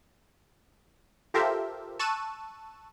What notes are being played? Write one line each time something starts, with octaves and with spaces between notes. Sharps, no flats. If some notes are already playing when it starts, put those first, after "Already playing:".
F4 G4 A4 A#4 C5 E5
A5 C#6 E6 F#6 D#7 E7